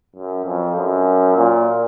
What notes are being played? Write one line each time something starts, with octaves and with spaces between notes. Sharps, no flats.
F#2
F2
F#2
A#2